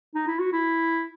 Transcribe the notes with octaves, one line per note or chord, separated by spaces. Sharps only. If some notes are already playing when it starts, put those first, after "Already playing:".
D#4
E4
F#4
E4